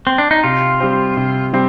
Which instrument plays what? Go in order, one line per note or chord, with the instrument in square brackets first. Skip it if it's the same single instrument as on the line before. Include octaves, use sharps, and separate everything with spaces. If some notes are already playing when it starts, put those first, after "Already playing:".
[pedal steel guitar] C4
D4
D#4
[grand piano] C3 [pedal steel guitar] F4
[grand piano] G3 C4 G4 C5
C3
G3 C4 G4